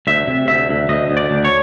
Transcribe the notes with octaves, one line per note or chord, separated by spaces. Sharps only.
D2 E5
C3
D2 E5
D2
D2 D#5
D2
D5
D2
C#5